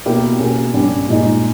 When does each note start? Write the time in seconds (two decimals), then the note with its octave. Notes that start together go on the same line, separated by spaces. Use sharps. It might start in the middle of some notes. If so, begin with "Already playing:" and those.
0.06 B2 A#3 E4 G4
0.40 B2 A#3 C#4 G#4
0.74 G2 G3 C#4
1.09 A#2 G#3 D#4